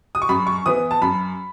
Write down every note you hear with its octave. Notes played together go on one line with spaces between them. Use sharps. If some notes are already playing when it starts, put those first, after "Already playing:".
D#6
C#6
F#2 B5
C#6
E3 B3 D#6
A5
F#2 B5